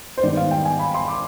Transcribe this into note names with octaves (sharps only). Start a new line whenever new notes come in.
C5
G#2 D#3 G3 B3 D5
F5
G5
G#5
B5
C6
D6